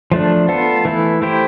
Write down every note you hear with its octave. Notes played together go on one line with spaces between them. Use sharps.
F3 A3 D4
B3 F4 A4
E3 A3 E4
A3 E4 G4 C5